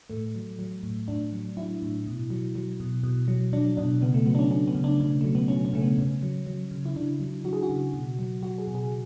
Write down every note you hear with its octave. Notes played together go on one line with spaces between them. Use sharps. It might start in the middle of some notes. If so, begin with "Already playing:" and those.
A2 A3
F#3
F#3
A2
A2 D4
F#3
F#3 E4
A2
B2
F#3
F#3
B2
B2
F#3
F#3 D4
B2 D4
C#3 B3
A3
F#3 B3
D4
C#4
F#3 D4
B3
C#3
D4
C#3 D4
F#3 A3
B3
F#3 C#4
C#4
C#3 A3
B3
C#3 C#4
F#3
F#3
C#3
E4
C#3 D4
F#3
F#3 F#4
G#4
F#4
C#3
B2
F#3
F#3 F#4
G#4
B2
G#4